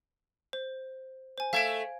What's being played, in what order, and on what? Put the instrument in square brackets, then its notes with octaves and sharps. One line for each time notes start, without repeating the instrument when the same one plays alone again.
[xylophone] C5
C5 G#5
[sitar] A3 E5 [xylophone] F5 G#6 D7